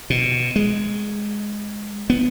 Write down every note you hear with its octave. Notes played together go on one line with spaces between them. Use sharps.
B2
G#3
B3